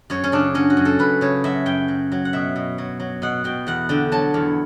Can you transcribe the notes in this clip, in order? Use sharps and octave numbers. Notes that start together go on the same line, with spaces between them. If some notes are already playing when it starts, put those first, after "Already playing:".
F#2 C#5
C#4
C#3 D4
F#3 C#4
F#4
F#2
A4
F#2 B4
C#3 C#5
F#3 E5
F#2 G5
F#3
F#3
F#5
B2 E5
B2
F#3
F#3
B2 F#5
B2 G5
E2 F#5
D3 G5
F#3 A5
E2